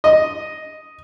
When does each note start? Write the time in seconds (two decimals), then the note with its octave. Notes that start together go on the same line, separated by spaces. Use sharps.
0.04 D#5